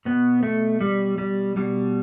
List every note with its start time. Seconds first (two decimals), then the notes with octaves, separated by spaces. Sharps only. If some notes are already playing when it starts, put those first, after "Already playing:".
0.05 B2 B3
0.43 A3
0.81 G3
1.18 G3
1.56 B2 G3